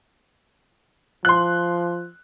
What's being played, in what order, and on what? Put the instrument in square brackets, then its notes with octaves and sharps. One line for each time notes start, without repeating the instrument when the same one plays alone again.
[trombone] F3 [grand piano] C6 F#6